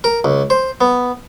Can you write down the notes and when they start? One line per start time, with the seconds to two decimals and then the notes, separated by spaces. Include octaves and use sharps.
0.04 A#4
0.24 C#2
0.50 C5
0.81 B3